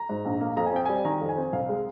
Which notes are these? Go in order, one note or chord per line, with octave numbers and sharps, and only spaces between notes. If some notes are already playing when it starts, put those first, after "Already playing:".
Already playing: A#5
G#2
A#1
A#3
F2 A#5
G#5
C4 G5
G3 G#5
D#3 A#5
F2
G#5
C4
C2 F5
G#3